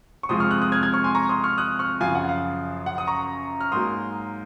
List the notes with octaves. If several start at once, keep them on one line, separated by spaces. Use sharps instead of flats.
C#6
F2 C3 F3 G#3 C6 D#6
C#6 F6
D#6 F#6
D#6 F#6
F6 G#6
F6 G#6
C#6 F6
G#5 C6
A#5 C#6
C6 D#6
C#6 F6
D#6 F#6
C#6 F6
F#2 C#3 F3 F5 G#5
F#5
F5
F#5
D#6
A#5 C#6
F6
G#2 F#3 A#3 C6 D#6